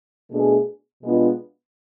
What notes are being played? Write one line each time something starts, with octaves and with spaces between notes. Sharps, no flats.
B2 A3 D4 G#4
B2 G#3 B3 D4 F4